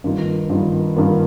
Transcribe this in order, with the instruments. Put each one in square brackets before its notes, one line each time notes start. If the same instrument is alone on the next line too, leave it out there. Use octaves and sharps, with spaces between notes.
[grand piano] G2 D#3 A#3 F4
G2 D#3 A#3 F4
G2 D#3 A#3 F4